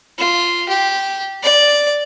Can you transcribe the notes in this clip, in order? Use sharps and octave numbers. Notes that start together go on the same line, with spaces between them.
F4
G4
D5